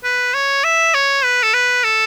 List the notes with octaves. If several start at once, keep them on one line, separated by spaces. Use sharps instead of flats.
B4
C#5
E5
C#5
B4
A4
B4
A4